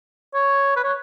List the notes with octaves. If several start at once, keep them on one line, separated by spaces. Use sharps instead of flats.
C#5
B4
C#5